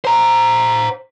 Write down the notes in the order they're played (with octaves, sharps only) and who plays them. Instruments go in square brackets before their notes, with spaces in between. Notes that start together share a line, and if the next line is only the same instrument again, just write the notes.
[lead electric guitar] C5 A#5